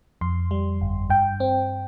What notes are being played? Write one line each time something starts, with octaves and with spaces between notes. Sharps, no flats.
F2 C6
G3
G1
G2 G5
C4